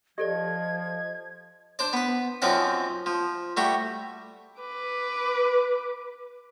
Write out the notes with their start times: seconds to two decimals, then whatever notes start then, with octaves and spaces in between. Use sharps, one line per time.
0.18 F3 G4 A4 D5 D#5 G#6
1.79 D4 C5 D5
1.93 B3 B4
2.42 F#2 F3 C4 D#4 D5 F#5
3.06 F3
3.57 G3 A3 F#4 G4
4.61 B4 D6